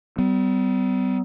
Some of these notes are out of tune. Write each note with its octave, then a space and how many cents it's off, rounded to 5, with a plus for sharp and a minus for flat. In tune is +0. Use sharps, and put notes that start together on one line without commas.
G3 -35 B3 +45